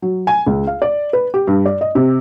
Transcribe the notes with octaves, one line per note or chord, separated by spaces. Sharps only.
F#3
G#5
C#2
F5
D5
B4
G4
G2
D5
D#5
C3